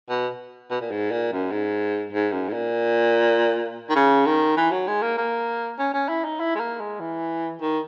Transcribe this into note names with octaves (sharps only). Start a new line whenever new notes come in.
B2
B2
A#2
G#2
A#2
F#2
G#2
G#2
F#2
G#2
A#2
D#3
C#3
D#3
E3
F#3
G#3
A#3
A#3
C#4
C#4
E4
D#4
E4
G#3
A#3
G#3
E3
D#3